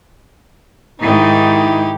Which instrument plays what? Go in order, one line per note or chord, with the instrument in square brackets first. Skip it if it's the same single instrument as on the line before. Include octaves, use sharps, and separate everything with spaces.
[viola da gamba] G#2 D#3 [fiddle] D#4 G4 [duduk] E4